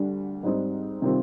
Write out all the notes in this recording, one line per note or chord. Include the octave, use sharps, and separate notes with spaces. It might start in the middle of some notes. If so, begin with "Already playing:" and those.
Already playing: D2 D3 G3
G#2 G3 C4 D#4
C3 D#3 G3 C4 F4